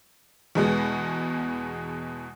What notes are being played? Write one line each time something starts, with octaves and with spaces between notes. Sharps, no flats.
E2 B2 G#3 B3